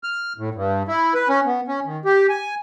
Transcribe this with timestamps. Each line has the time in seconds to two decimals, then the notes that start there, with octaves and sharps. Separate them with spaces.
0.03 F6
0.38 A2
0.55 G2
0.88 E4
1.14 B4
1.29 C#4
1.46 B3
1.68 C#4
1.85 D#3
2.05 G4
2.29 G#5